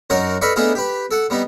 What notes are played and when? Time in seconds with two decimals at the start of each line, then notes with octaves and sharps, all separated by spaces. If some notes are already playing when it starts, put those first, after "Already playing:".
0.10 F#2 D#4 F#4 A#4 C#5
0.41 A4 B4 D5 D#5 F5 C#6
0.56 A3 B3 D4 D#4 G#4 F5
0.75 G4 B4
1.11 A4 F#5
1.30 G3 B3 D#4